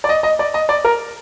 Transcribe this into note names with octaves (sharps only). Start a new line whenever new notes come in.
D5
D#5
D#5
D5
D#5
D5
A#4